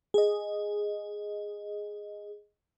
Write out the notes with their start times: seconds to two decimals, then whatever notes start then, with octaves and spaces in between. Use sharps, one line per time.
0.14 G#4 D#5